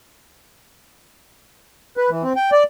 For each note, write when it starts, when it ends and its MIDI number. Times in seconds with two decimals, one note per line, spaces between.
1.97 2.10 71
2.10 2.22 52
2.23 2.33 60
2.36 2.50 79
2.52 2.63 74